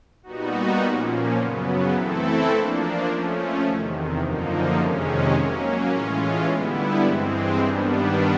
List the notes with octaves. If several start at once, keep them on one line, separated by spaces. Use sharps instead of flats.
A#2 G3 B3 D#4 F#4
A#2 F3 A#3 C#4
F#2 C#3 F#3 B3
E3 A3 C4 E4 A4
F3 A#3 D4
F3 A3 C#4
E2 C3 D#3
F#2 D3 F3 A#3 D#4
F2 C3 D#3 G#3 C#4
F#3 A#3 C#4
A2 E3 G#3 C#4 F4
D3 G3 B3 E4
G2 E3 G#3 C4
G2 D#3 G3 B3 D4